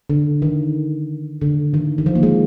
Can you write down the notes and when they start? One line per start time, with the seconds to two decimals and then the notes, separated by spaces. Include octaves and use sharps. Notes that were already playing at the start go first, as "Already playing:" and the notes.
0.10 D3
0.42 D#3
1.41 D3
1.74 D#3
1.98 D#3
2.06 F3
2.15 A#3
2.23 G#3